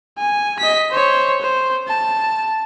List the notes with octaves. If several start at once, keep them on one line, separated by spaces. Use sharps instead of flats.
G#5
D#5 B6
C5 C#5
C5
A5